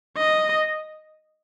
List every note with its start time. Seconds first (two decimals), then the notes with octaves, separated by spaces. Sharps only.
0.17 D#5